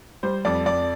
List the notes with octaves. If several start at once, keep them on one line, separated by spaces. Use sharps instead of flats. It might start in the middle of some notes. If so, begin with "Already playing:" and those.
G3 C5
F2 D5
F2 D5